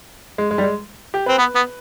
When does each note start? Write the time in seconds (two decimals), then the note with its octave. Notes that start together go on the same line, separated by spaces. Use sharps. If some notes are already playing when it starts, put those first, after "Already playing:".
0.38 G#3
0.51 G#3
0.58 G3
0.63 G#3
1.14 G4
1.26 C4 B4
1.39 B3
1.56 B3